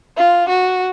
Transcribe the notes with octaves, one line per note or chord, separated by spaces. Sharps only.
F4
F#4